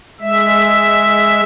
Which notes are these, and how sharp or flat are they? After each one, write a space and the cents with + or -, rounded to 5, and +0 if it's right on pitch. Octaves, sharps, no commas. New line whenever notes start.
G#3 +0 E5 +0